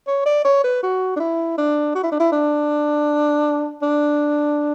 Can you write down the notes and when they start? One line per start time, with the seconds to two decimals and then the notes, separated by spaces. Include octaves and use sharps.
0.07 C#5
0.26 D5
0.45 C#5
0.64 B4
0.83 F#4
1.16 D4
1.20 E4
1.58 D4
1.95 F#4
2.03 E4
2.11 D4
2.20 E4
2.32 D4
3.82 D4